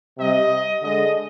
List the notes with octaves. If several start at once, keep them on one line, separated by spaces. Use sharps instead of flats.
C3 G3 D#5
D3 G#3 D#5